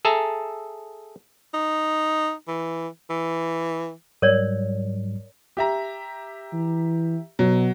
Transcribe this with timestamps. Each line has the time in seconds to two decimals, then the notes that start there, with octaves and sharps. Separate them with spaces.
0.05 G#4 A4 E5 A5 A#5
1.54 D#4
2.48 E3
3.10 E3
4.22 G#2 F#3 G3 A#4 C#5 D5
5.57 G4 E5 A#5
6.53 E3
7.39 B2 F#3